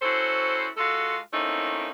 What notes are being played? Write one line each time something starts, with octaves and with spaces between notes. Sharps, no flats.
C#4 E4 F#4 A4 C5
G#3 F4 F#4 A4
A3 A#3 C4 C#4 D#4 E4